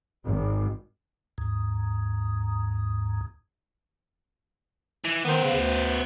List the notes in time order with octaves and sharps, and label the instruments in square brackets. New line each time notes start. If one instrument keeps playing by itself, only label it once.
[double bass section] G#1
[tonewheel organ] D#2 G#2
[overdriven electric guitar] E3
[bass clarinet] D#3 [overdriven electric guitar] B3 C5
[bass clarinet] C#3
D2